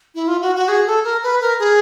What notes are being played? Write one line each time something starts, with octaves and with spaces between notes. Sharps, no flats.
E4
F4
F#4
F#4
G#4
A4
A#4
B4
A#4
G#4